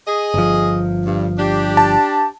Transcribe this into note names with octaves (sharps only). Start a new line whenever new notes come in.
G#4 D#5
G1 F3
G2
D4 G4
A5